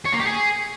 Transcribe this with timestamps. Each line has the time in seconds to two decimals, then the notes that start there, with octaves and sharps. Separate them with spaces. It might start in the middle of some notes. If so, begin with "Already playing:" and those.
0.05 C#5
0.12 A#3
0.20 G4
0.27 G#4